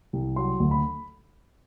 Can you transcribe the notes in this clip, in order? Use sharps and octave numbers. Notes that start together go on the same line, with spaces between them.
C2
F#3 C6
D2
B5